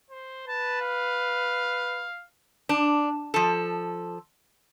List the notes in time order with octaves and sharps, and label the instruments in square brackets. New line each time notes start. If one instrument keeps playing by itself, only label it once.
[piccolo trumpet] C5
[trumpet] B4 [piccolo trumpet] A5
[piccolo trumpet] F5
[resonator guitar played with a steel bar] D4
F3 A4